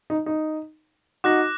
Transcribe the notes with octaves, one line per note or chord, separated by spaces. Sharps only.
D#4
D#4
D#4 F#4 D6 F#6 A#6